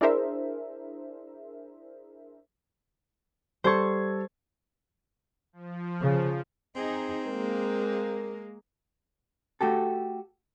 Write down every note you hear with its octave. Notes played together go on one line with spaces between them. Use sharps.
D4 E4 G#4 A#4 C5 E5
G3 A4 C5 C#6 G#6
F3
C#3
C4 D#4 G#4
G#3 A#3 A#4
A3 F#4 G4 A4